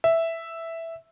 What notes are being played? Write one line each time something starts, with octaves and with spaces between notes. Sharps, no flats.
E5